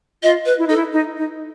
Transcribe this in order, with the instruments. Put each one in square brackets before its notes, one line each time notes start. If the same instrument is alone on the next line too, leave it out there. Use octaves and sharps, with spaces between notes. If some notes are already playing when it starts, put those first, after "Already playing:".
[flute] F4 [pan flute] D#5
[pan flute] B4
[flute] E4
[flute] D#4 [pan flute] A4
[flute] E4
D#4
D#4